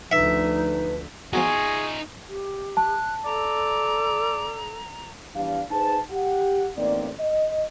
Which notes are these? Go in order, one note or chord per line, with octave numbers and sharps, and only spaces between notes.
D2 D3 F3 D#4 B4 E5
F3 B3 D#4 F4 F#4 G#4 G#5 C#6
G4
A5 F#6
A4 D5 A#5
E3 G3 B3 D4 F5
D#4 G#4 B4 C5 A5
G4 F#5
A1 A#3 C4 D#4 D5
D#5